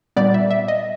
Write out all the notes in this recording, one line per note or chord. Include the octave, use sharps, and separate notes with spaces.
A#2 G3 B3 D5
E5
E5
D#5